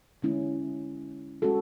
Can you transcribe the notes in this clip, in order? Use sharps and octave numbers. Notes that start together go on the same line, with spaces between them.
D3 G#3 C#4 E4
G#3 C#4 F#4 A4